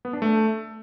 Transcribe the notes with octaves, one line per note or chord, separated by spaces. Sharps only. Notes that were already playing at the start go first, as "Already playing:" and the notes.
B3
D4
A3